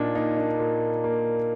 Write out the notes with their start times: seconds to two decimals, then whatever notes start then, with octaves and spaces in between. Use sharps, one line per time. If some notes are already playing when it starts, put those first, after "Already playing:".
Already playing: A#2 D4 D#4
0.15 A#3 D#4
0.38 D4
0.59 A#2
1.04 A#3